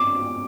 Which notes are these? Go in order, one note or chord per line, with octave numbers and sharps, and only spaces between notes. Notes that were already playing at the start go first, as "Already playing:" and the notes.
Already playing: D6